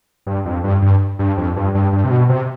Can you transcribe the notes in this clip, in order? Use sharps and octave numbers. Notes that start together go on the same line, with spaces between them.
G2
F2
G2
G2
G2
F2
G2
G2
G2
C3
B2
C3